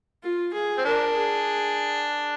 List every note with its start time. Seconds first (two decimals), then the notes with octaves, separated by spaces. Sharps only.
0.23 F4
0.54 G#4
0.78 C4
0.85 D4 A#4
1.16 G#4